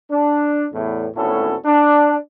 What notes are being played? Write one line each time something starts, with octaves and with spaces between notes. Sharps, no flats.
D4
E2 A2
G#1 D2 A2 B3 C#4 A4
D4